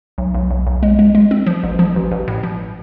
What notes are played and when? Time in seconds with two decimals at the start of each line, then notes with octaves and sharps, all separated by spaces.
0.18 B1
0.35 B1
0.50 B1
0.66 B1
0.83 G#3
0.99 G#3
1.15 G#3
1.31 C4
1.47 F3
1.63 A1
1.79 F3
1.96 A1
2.11 A1
2.28 A2
2.43 F3